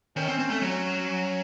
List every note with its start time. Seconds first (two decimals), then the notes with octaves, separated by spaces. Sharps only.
0.16 D#3 C#4
0.28 C4
0.39 C4
0.50 A3
0.62 F#3 C#4